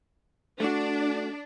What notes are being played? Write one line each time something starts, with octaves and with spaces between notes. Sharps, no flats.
A3 D4 F#4